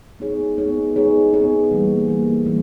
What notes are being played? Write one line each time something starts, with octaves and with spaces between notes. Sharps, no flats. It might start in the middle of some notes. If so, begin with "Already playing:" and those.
B3 D#4 G#4 C#5
B3 D#4 G#4 C#5
B3 D#4 G#4 C#5
B3 D#4 G#4 C#5
E3 G3 A#3
E3 G3 A#3
E3 G3 A#3